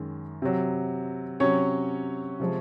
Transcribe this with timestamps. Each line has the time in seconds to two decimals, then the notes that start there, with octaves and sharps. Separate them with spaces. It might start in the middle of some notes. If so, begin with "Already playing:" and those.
Already playing: F#2 D#3 G#3
0.42 C3 F#3
1.40 C3 F#3 C#4 C#5
2.40 C3 F3 G#3